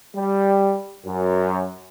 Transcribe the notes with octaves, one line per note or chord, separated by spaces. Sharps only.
G3
F#2